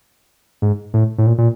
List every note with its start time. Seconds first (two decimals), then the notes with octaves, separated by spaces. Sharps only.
0.62 G#2
0.94 A2
1.18 A2
1.26 A#2
1.38 A#2